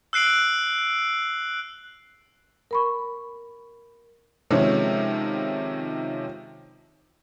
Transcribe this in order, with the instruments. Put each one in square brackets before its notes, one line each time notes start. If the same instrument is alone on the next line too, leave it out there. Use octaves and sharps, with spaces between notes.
[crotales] E6 F#6 C7 D7 F#7
[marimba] A#4 B5 C#6
[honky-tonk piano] C3 D#3 F3 G#3 C#4